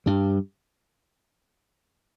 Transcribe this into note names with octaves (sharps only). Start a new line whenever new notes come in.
G2 G3